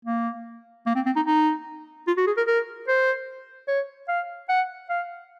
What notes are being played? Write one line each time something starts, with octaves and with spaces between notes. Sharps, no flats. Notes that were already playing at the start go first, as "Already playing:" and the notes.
A#3
A#3
C4
C4
D#4
D#4
F4
F#4
G#4
A#4
A#4
C5
C#5
F5
F#5
F5